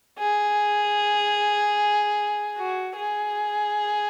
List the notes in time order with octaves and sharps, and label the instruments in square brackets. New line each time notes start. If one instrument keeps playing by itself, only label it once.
[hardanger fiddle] G#4
F#4
G#4